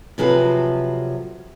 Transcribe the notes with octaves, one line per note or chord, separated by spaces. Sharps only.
C3 F3 F#3 G#4 A4 B4